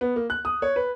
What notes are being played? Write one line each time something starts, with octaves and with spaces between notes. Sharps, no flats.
B3
A#3
F#6
D#6
C#5
B4